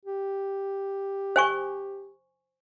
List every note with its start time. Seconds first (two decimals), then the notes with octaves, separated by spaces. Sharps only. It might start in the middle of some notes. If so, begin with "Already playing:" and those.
0.05 G4
1.36 C5 G#5 C#6